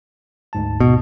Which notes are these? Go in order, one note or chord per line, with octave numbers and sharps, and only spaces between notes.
D2 G#2 A5
B2